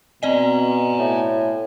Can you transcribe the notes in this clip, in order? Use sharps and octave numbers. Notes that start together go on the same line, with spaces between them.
B2 C4 D5 D#5 G#5 A#5
A2